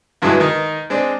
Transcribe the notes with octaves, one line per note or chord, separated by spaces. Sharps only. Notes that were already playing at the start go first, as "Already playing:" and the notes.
E2 G2 F#3 G#3 E4
D#3 D#4
G#3 C4 D4